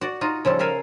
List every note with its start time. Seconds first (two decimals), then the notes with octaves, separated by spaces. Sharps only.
0.01 F#4 D5
0.21 D#4 F4 F#4
0.45 C#3 F3 G3 A4
0.59 A4 A#4 E5 F5 G#5